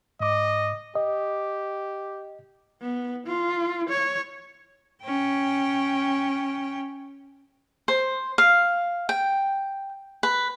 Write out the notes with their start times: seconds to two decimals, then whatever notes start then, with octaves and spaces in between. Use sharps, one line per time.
0.20 G#2 D#5 D6
0.95 G4 D#5
2.82 B3
3.27 F4
3.89 C#5
5.03 C#4 G5
7.88 C5
8.38 F5
9.09 G5
10.23 B4